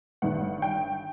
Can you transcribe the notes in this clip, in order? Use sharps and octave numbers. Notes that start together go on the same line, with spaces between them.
G1 G2 D#3 F#5
G5